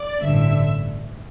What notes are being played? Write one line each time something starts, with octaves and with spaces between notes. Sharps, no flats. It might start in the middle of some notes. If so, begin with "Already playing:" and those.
Already playing: D5
A1 G2 D3 E5